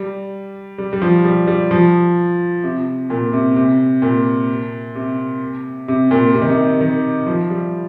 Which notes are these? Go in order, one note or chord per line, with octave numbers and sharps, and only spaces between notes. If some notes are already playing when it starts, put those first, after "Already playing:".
Already playing: G3
G3
G3
F3
G3
G3
F3
C3
A#2
C3
C3
A#2
C3
C3
A#2
C3
D#3
C3
D#3
F3
G3